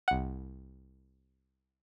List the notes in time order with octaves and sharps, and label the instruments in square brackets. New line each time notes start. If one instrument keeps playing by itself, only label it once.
[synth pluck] C2 F#5